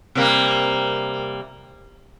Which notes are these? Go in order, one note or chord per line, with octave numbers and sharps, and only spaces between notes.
C3 G3 A#3